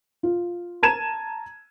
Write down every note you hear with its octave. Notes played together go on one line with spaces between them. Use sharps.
F4
A5 A#5 G#6 D#7 E7